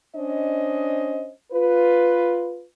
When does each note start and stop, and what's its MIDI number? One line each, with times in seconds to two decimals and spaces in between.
0.15 1.31 61
0.15 1.31 62
0.15 1.31 72
0.15 1.31 75
1.52 2.65 65
1.52 2.65 71